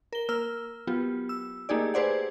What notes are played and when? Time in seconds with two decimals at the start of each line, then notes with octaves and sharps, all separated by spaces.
0.12 A#4 G7
0.29 A#3 A#4 E6 F6
0.87 F#3 B3 F4 G4
1.29 E6
1.69 A3 A#3 D#4 G4 G#4 D5
1.94 G4 G#4 B4 C5 D5 F#5